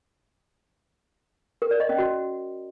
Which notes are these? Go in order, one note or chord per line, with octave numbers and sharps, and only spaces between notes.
A#4
D5
D#5
C#4
F#4